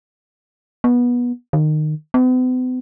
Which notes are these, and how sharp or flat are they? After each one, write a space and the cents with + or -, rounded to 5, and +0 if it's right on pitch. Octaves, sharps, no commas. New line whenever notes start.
B3 -20
D#3 -25
B3 +45